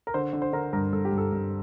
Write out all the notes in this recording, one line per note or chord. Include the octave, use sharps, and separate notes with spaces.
A#4
D3 C5
D3
C5
D3 A#4
G2 A#4
G2 A4
G4
G2
A4
G2